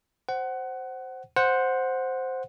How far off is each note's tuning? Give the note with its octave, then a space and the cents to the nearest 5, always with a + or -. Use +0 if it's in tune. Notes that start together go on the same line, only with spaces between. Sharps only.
C5 +0 F#5 +20
C5 +0 F#5 -10